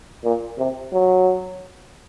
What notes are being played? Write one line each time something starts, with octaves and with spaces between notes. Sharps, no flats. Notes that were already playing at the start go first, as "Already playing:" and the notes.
A#2
C3
F#3